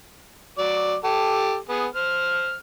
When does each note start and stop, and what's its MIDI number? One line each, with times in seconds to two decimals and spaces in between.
0.58 0.96 54
0.58 0.96 74
1.04 1.56 67
1.04 1.56 69
1.69 1.86 59
1.69 1.86 68
1.95 2.55 72
1.95 2.55 89